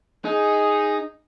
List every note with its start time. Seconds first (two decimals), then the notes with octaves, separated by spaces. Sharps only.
0.25 D#4 G#4